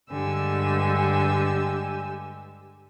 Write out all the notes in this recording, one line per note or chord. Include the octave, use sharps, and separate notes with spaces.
G2 D3 G#3 G4 G#5 E6